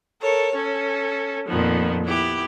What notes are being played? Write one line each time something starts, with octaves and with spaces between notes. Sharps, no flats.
A4 A#4 C#5
C#4 A4
F2 A#2 D#3 F3 B3
B3 E4 G4